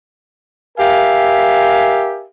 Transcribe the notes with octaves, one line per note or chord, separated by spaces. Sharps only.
G4 A#4 E5 F5 G#5